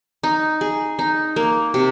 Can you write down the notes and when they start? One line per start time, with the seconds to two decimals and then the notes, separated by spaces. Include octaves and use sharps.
0.23 D#4
0.61 G#4
0.99 D#4
1.36 A#3
1.74 C3